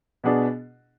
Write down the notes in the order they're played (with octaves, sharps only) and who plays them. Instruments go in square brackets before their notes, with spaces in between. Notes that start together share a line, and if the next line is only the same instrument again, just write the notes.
[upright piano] B2 B3 D4 G#4